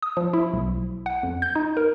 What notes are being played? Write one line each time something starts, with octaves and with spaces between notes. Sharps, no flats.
D#6
F3
E4
B1
F#5
F2
G6
D#4
A#4